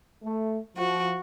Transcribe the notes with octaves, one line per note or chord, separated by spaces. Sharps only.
A3
F3 F#4